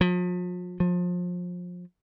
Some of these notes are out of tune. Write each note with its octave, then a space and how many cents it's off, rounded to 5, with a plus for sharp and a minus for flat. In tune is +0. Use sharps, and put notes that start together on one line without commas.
F3 +45
F3 +30